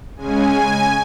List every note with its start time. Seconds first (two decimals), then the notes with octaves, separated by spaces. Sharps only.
0.17 C#3 G#3 C#4 G#5